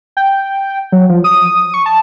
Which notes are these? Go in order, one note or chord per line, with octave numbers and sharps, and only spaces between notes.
G5
F#3
F3
D#6
C#6
A5